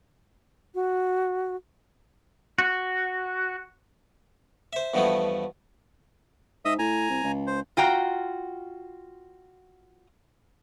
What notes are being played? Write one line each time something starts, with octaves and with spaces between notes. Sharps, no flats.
F#4
F#4
C5 E5
E2 G2 B2 F3 A3 B3
G#2 D#5 E5 D#6
A2 G#5 A#5
C2
C#2
C5
F4 F#4 G5 A#5